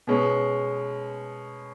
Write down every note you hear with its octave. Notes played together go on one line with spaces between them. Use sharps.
B2 G#3 C#4